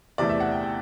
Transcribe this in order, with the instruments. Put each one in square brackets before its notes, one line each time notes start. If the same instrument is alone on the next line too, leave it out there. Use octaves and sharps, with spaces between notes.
[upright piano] E2 C3 E3 A3 D5
E5
F#5
G5
G5